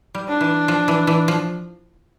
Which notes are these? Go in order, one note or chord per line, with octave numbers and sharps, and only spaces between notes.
G3
D4
E3
F3
E3
E3
F3